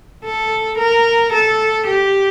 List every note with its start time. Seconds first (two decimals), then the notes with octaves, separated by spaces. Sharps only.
0.24 A4
0.78 A#4
1.32 A4
1.87 G4